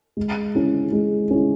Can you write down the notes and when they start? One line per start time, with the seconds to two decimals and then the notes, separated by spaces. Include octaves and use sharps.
0.17 G#3
0.55 C#4 E4
0.92 G#3
1.31 C#4 E4